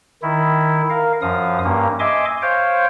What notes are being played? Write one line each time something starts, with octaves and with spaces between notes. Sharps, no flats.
D#3 E4
A#4 F5
F#2 F3 F5 D#6
G2 A#3 C#4
D#5 E5 G#5 C6 D6
C5 C#5 F5 G5